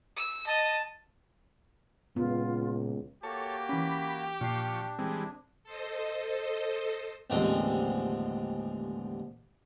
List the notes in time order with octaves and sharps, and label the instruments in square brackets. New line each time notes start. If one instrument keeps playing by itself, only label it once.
[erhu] E6
[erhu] D#5 [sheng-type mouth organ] A5
[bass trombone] C#2 [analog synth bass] A#2 [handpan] B3 [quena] F4
[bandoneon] A#3 F#4 [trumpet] G4 [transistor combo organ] A4 C#5 [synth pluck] A5
[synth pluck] E3 C#4 [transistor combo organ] B5
[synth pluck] A#2 C7 [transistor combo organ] F3 C#6 [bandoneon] D4
[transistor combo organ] E3 G3 G#3 [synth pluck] C4
[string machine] A4 C5 D#5
[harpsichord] A1 D#2 D3 F3 G#3 C4